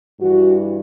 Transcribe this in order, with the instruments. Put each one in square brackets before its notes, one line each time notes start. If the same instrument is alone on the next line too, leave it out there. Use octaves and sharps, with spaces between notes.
[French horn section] G2 E3 F#4